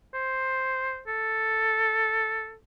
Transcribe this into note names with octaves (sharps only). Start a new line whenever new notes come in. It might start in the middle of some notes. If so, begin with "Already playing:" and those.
C5
A4